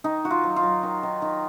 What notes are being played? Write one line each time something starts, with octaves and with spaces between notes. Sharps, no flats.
D#3 D#4
D#3 F#4
F4
F#3
F4
F#3
D#3
D#3
D#3